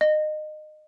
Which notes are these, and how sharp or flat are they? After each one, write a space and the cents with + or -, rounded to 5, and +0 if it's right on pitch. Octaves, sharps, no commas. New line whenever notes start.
D#5 -25